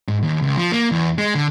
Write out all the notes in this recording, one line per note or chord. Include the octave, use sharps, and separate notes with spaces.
G#2
D#2
C#2
F3
A#3
E2
G#3
D3